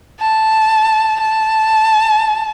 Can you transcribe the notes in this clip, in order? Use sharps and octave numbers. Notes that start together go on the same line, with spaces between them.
A5
A5